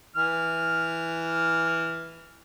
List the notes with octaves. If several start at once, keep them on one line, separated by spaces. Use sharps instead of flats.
E3 F6